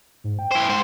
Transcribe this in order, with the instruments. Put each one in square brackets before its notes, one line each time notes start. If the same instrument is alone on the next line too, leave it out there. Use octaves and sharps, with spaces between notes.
[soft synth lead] G#2
G5
[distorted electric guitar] E4 C5
G#2 C5